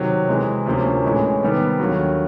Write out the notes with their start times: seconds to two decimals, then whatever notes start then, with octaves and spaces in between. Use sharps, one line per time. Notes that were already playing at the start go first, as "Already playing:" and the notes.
Already playing: C3 D#3 F#3
0.28 C3 E3 G#3
0.66 D2 C3 F3 A#3 C#4
1.04 A2 E3 G#3 C#4
1.41 C3 D#3 G3 B3
1.80 D#2 D3 F#3